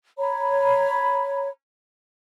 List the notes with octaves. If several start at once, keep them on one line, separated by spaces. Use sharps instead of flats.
C#5 A#5 B5